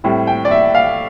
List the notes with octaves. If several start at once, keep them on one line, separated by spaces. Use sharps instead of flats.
A2 G3 C4 E4
G5
D5
E5
F5